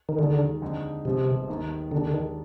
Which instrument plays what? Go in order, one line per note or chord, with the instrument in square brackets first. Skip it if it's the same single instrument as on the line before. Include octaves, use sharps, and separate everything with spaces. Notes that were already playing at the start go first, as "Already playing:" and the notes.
[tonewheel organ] D#3
[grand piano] D#2 D#3 G#3 [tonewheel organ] D3
[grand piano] F2 D3 G#3 D#4
[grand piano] G1 G2 F3 G#3 C4 [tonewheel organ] C3
[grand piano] D#2 D#3 A#3
[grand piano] D#2 D#3 G#3 D4 [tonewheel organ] D3
[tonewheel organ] D3
D#3